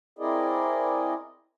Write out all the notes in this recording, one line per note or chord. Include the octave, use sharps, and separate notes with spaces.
C4 E4 G#4 A#4 D5 D#5